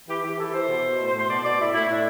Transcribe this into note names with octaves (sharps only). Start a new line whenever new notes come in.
E3 G4
E3 G4
E3 A4
E3 C5
B2
B2
A2
A2
C5
B2 D5
B2 D5
A2 E4
A2 E4
D4 E4